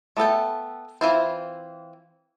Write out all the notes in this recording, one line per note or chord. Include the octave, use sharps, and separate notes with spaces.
A3 B3 A4 G5
E3 C4 E4 F4 C5